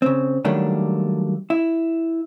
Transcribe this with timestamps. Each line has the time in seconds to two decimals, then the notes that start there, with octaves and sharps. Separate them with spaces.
0.02 C#3 C4
0.45 D#3 F#3 G3 A3 A#3 D4
1.50 E4